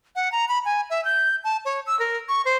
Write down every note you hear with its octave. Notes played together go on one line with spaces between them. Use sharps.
F#5
A#5
B5
G#5
E5
G6
A5
C#5
E6
A#4
C#6
C5